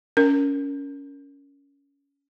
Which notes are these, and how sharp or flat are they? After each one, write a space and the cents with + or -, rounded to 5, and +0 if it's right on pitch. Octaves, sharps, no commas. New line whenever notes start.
C#4 +20 A#4 +0